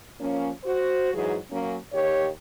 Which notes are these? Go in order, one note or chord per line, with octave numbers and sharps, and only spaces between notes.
F3 A#3 C#4
F#4 C5
G#2 E3 F#3 G#4
F#3 A#3 C#4
D#2 G4 C#5